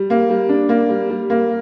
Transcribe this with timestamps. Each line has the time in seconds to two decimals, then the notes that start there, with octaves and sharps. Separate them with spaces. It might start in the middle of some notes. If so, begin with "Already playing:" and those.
Already playing: G3
0.10 A#3
0.30 G3
0.49 D4
0.69 A#3
0.89 G3
1.10 G3
1.30 A#3